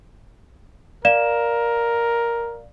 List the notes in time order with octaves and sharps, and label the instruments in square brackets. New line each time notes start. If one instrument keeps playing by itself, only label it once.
[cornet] A#4 [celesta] D5 F5 E7